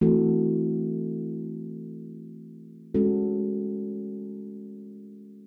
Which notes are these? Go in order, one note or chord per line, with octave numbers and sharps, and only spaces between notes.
E3 A3 C4 F#4 A4
G#3 C#4 F#4 A4